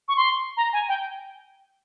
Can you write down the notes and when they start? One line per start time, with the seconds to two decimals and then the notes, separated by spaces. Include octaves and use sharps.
0.08 C#6
0.17 C6
0.57 A#5
0.73 G#5
0.88 G5